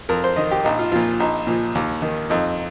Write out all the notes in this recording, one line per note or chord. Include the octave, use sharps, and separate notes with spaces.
F2 A#4
C5
D#3 D#5
G4
A#1 D#4
F4
A#2 F3 F4
A#1 D#4
A#2 F3
D#2
D#3
F2 D#4